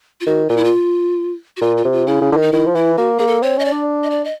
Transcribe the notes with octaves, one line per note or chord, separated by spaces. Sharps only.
F4
D#3 F#4
A#2 F4
E4
F4
F#4
A#2 F4
F4
C3
F4
C#3 E4
C#3
D3
D#3
D#4
D#3 E4
F3
E3 E4
A#3 F#4
A#3 G#4
A4
C4 C#5
C#4 D#5
D5
D4
D#5
D5
D#5